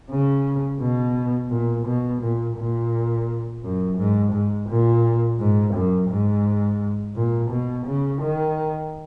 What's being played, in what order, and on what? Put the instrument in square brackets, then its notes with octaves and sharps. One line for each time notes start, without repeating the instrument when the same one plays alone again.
[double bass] C#3
B2
A#2
B2
A#2
A#2
F#2
G#2
G#2
A#2
G#2
F#2
G#2
A#2
B2
C#3
D#3